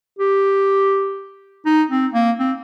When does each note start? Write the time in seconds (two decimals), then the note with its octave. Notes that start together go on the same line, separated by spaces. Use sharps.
0.19 G4
1.66 D#4
1.90 C4
2.14 A#3
2.39 C4